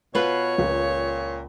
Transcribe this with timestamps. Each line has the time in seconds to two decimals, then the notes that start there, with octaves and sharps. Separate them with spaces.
0.15 B2 F4 B4 C#5
0.58 C#2 A#2